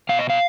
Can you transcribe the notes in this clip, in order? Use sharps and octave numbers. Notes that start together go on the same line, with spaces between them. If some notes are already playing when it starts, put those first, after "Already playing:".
B2 F5
D#5
F5